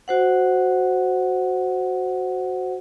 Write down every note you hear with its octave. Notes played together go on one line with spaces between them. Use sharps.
F#4 C5 F#5